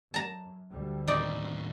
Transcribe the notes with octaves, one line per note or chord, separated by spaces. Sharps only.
F#2 A5 A#5
D2 D3 G3
D#2 A2 D#4 D5